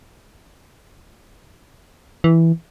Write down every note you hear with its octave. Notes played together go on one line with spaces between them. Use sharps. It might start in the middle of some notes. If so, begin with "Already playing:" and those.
E3